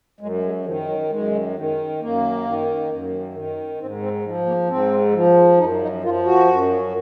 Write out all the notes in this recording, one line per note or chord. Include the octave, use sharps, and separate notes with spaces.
F#2 G#3
G#3
D#3 F3
F#3
F#2 G#3
D#3
F#2 A#3
D#3
F#2
D#3
G#2 C4
C4
F3 G#3
A#3
G#2 C4
F3
F#2 D#4
D#4
F3 F4
F#4
F#2